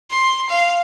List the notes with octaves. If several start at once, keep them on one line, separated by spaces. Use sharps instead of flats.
C6
F5